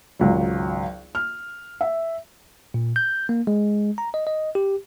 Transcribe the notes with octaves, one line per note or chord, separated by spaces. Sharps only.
G#1 C#2 F#3
F6
E5
A#2
G6
A#3
G#3
A#5
D#5
D#5
G4